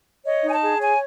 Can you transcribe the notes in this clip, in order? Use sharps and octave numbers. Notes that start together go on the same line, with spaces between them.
C#5 D#5
D#4
G#5
A5
G#4
C#5 G#5